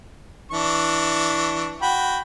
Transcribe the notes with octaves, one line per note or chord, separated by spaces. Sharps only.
E3 D4 C#6
F#4 G5 B5